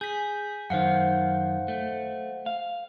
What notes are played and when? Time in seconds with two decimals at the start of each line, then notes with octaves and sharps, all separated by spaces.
0.01 G#4 G6 B6
0.70 F#2 D#3 C5 F5 F#5
1.68 A3
2.46 F5